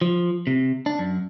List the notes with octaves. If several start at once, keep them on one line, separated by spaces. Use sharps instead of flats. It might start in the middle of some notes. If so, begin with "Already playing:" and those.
F3
C3
D4
F#2